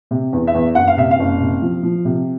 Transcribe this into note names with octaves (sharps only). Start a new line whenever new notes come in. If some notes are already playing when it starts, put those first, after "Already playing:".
C3
E2
E5
E2
F#1 F#5
F5
C3 E5
F5
F#1
C3
F3
F3
C3